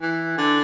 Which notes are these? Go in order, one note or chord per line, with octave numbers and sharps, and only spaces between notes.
E3
D3